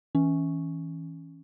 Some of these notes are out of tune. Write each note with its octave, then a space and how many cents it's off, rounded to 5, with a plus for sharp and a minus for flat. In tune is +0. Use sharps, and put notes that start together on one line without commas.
E3 -25 C#4 +0